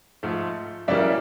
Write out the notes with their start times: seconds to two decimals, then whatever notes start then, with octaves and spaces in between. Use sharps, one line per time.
0.23 G#2 F3 A3
0.88 F#2 C#3 E3 G3 A#3 D5 E5